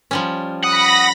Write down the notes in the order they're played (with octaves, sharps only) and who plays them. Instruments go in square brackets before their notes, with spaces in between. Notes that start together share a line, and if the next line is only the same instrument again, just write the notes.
[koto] F3 G3 C#4
[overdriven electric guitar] F#5 [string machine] B5 A#6 [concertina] D#6